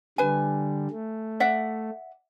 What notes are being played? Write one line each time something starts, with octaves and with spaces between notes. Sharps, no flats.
D3 G3 B4 G#5
A3
D5 E5 F#5